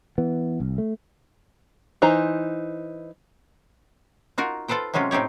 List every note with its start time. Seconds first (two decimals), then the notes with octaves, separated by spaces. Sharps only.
0.18 E3 B3
0.60 C2
0.78 A3
2.02 E3 D#4 C5 A#5
4.38 D#4 F4 F#4 A#4
4.68 F4 A4 B4 C5 G5
4.94 C3 F#3 G#3 C#4 F4
5.11 A2 C4 D#4 G4 C#5